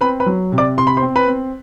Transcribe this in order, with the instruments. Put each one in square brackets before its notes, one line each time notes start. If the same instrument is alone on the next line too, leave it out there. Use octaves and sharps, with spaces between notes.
[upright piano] C4 B4 B5
B4 B5
F#3
C3
D5 D6
C3 C6
B5
C5 C6
C4
B4 B5
C4